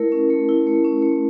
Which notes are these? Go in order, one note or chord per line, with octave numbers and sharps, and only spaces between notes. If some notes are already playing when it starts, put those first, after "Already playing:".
Already playing: A3 E4 A#4
C#4
A3
E4
A3
C#4
A3